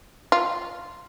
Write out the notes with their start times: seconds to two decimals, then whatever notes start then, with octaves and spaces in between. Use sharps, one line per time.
0.32 F4